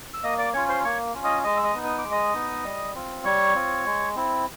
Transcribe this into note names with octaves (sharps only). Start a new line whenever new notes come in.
E6
A#3 D#5 D#6
D5 D6
C#4 F4 C#5 C#6
C5 C6
A#3 C#5 C#6
C#4 F4
D#5 D#6
G#3 D#5 D#6
E6
D#5 D#6
B3 D#4
D#6
D6
G#3
D#5 D#6
B3 D#4
G3
C4 F4
G3 C#5 C#6
C4 F4
G#3
C4 E4